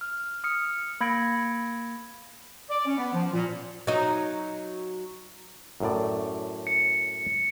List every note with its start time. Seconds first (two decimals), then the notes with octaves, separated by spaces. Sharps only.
0.01 F6
0.44 D#6 F6 C#7
1.01 A#3 B5 G#6 A#6 C#7 D7
2.70 D5
2.86 C#4
2.97 B3
3.13 F3
3.33 A#2
3.87 F#3 D#4
5.80 F#2 A2 D5
6.67 C#7